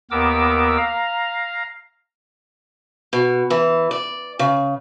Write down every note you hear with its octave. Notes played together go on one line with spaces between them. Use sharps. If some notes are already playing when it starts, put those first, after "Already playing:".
D#2 B3 A#4 D6 E6
F5 A#5
B2
E3
D5
C#3